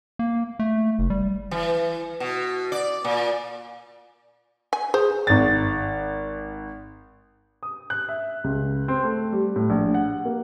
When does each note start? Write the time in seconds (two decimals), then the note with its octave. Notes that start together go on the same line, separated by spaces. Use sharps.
0.19 A#3
0.59 A3
0.99 F#1
1.10 G3
1.51 E3
2.20 B2
2.72 D5
3.05 A#2
4.73 G#5
4.94 G#4 C5
5.27 G#1 A6
7.63 D#6
7.90 F#6
8.09 E5
8.44 C#2
8.88 C4
9.03 A3
9.32 G3
9.56 A2
9.70 A#1
9.94 F#5
10.25 A#3